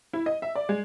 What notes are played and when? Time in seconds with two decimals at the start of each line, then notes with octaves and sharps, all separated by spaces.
0.13 E4
0.26 D#5
0.42 E5
0.55 D5
0.69 G#3